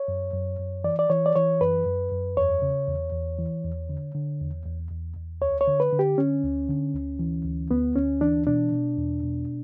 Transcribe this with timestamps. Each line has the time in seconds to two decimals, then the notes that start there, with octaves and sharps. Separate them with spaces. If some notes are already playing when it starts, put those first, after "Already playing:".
Already playing: C#5
0.08 F#2
0.34 F#2
0.59 F#2
0.84 E3 D5
0.99 D5
1.10 E3 C#5
1.26 D5
1.35 E3 C#5
1.61 F#2 B4
1.86 F#2
2.12 F#2
2.37 E2 C#5
2.62 C#3
2.88 E2
3.13 E2
3.39 E3
3.64 E2
3.89 D3
4.15 D3
4.41 E2
4.66 E2
4.91 E2
5.16 E2
5.41 D2 C#5
5.61 C#5
5.67 D3
5.80 B4
5.92 D3
5.99 G4
6.18 D3 C#4
6.43 D2
6.69 D3
6.94 D2
7.19 E3
7.45 D2
7.71 D2 B3
7.96 D2 C#4
8.21 E3 D4
8.47 B2 D4
8.72 B2
8.97 E2
9.23 B2